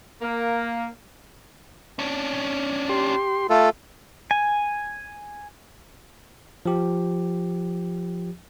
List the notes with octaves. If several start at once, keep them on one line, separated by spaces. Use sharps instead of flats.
A#3
C#4 D4
G4 C6
A3 F4 A4
G#5
F3 G4